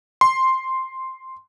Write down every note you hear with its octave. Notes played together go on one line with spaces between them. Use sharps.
C6